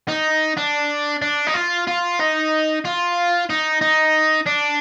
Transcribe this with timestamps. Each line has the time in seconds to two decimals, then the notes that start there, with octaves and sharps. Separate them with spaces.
0.08 D#4
0.57 D4
1.22 D4
1.47 D#4
1.54 F4
1.87 F4
2.20 D#4
2.85 F4
3.50 D#4
3.81 D#4
4.47 D4